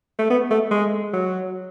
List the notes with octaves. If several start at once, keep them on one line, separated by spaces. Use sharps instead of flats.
A3
B3
A3
G#3
F#3